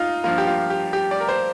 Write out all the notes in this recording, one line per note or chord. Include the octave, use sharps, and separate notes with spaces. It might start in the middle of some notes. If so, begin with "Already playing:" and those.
Already playing: D#4 F4
G2 F3 A#3 F4
G4
F4
G4
G4
D5
A#4
C5